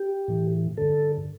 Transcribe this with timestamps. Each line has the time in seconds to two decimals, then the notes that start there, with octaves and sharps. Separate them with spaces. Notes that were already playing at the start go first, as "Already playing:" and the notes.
Already playing: G4
0.28 A2 E3
0.77 G2 D3 A4